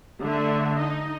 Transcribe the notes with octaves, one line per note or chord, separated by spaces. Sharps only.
D3 A3 E5
D#4 D#5